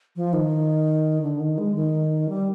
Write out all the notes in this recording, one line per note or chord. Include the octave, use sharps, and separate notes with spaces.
F3
D#3
D3
D#3
G#3
D#3
G3